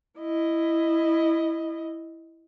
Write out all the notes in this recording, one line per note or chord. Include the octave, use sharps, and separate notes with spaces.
E4 D#5